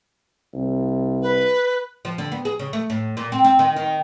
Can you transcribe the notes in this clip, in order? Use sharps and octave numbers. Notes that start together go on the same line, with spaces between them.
C2
B4
F3
D3
B3
G#4
C#3
A3
A2
A#2
C4
C4
D#3
D#3